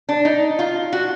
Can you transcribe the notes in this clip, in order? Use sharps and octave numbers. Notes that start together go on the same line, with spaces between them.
D4
D#4
F4
F#4